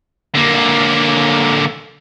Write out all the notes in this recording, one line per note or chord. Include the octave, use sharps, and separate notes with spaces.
D3 A#3